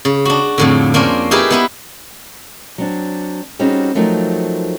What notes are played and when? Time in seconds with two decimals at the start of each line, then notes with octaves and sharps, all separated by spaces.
0.05 C#3
0.25 D4 F#4
0.58 F2 A2 D3
0.94 A#3 C#4 D4 A#4 C5
1.31 D#4 E4 G4 G#4 A#4 B4
1.50 B3 E4 B4
2.78 F#3 C4 D4
3.59 G3 C4 C#4 D#4 F#4 G#4
3.95 F3 F#3 A3 C4 D#4 A#4